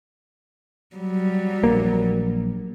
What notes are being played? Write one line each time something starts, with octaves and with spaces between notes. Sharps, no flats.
F#3 G3
A#1 A#3